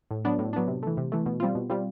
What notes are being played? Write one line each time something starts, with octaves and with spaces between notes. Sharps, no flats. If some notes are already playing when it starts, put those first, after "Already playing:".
A2
F#3 B3 D4
A2
F#3 B3 D4
C3
E3 A3
C3
E3 A3
B2
G3 C4 F4
B2
G3 C4 F4